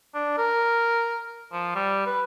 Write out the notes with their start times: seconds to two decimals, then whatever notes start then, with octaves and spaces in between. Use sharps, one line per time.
0.14 D4
0.38 A#4
1.53 F3
1.75 G3
2.06 B4